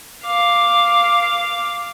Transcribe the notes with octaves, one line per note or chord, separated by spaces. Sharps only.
F5 D6